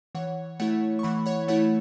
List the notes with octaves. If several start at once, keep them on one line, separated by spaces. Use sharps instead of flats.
E3 C#5 F#5
A3 E4 C#5 F#5
C#6
E3 F#5 B5
C#5 F#5
A3 E4 C#5 F#5